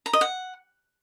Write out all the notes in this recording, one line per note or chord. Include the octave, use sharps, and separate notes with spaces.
A#5
D#5
F#5